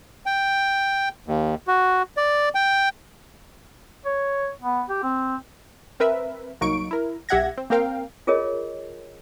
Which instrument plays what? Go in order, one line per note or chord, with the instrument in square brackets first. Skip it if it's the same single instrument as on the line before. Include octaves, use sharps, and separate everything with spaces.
[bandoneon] G5
D#2
F#4
D5
G5
[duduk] C#5
B3
G4
C4
[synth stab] C4 A#4 B4 E5
C2 F#3 A#3 D#4 C#6 D7
E4 A#4
B1 G4 E5 F#5 G#6 A#6
C4
A#3 C4 A#4 F5 G5
[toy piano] F4 G#4 A#4 C#5 D#5